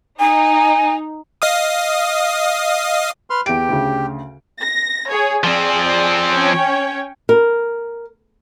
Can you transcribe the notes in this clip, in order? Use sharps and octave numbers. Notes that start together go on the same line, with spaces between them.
D#4 G#5
D#5 F5 D#6
B4 C6 F6
E2 G4 D7
D2 C#3
A#6
G#4 C#5
F3 C4 G#4 D5
C#4 C#5 G5
A#4